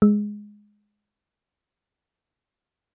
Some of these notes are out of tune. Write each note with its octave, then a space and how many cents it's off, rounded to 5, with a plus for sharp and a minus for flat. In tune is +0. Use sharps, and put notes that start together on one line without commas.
G#3 +0